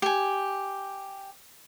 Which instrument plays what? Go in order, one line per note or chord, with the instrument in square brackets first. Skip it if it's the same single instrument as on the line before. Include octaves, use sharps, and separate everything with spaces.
[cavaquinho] G4 G#5